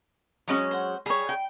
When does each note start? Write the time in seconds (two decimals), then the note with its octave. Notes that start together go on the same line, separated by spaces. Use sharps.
0.48 F#3 G#3 C#4
0.71 C5 F#5
1.06 G3 G#4 C#5
1.29 G5